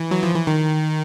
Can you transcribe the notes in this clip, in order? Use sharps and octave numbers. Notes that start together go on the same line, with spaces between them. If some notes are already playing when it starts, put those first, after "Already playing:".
Already playing: E3
F#3
F3
E3
D#3